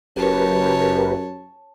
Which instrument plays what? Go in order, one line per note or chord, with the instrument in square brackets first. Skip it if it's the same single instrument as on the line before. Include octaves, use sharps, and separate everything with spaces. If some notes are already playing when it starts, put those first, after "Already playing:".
[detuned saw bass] F#1 [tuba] F#2 [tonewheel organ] G4 A#4 B4 [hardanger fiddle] C#5 A5